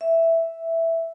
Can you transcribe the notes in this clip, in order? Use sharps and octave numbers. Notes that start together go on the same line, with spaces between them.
E5